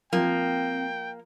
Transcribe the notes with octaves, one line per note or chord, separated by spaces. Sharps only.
F3 A#3 C4 G5